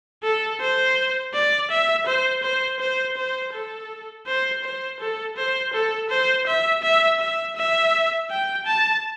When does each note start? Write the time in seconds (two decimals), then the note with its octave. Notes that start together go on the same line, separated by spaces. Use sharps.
0.23 A4
0.61 C5
1.33 D5
1.70 E5
2.06 C5
2.43 C5
2.80 C5
3.17 C5
3.53 A4
4.26 C5
4.64 C5
5.00 A4
5.37 C5
5.73 A4
6.10 C5
6.47 E5
6.82 E5
7.20 E5
7.56 E5
8.30 G5
8.66 A5